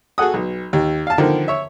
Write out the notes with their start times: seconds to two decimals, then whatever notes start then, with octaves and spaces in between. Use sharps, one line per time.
0.18 F#4 G#4 A4 F#5 D#6
0.34 B1
0.73 D#2
1.07 F5 A5
1.18 D3 D#3 F3 A#4
1.48 C#5 E5